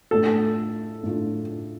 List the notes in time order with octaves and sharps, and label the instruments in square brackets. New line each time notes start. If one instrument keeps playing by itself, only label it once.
[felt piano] A2 A3 D4 F4 [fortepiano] A4
[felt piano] A2 A3 D4 F4